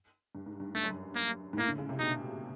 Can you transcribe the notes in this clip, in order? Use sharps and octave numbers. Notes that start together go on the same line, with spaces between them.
G2
G#2
G2
G2 A3
F#2
G2
A#3
G#2
A2 A#3
D3
C#3
C3
B2 D#4